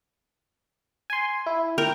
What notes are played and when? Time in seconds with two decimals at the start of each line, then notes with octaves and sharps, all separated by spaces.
1.10 G#5 C6
1.46 E4
1.78 A#4 G5